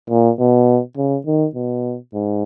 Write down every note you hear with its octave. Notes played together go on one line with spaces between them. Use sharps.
A#2
B2
C#3
D#3
B2
G#2